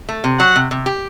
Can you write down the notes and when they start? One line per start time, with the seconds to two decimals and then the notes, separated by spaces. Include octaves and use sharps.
0.09 A3
0.24 C3
0.39 F#3 F#5
0.56 C3
0.71 C3
0.86 G4